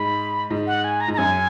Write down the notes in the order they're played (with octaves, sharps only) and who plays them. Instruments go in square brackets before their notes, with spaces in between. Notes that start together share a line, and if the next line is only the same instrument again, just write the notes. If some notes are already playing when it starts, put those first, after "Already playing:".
Already playing: [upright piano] G#2 [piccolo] B5
[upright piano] G#2
[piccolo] F#5
G#5
A#5
[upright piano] G#2
[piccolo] A#5
[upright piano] F#2 [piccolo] G#5